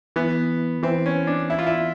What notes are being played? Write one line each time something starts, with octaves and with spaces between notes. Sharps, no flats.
E3 B3
E3 C4
C#4
D4
E4
F4
E4